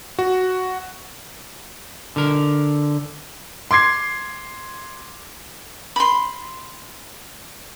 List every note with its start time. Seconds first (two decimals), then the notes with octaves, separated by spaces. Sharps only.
0.19 F#4
2.16 D3 A#4
3.71 C6 D6 G#6 C7
5.96 B5 C6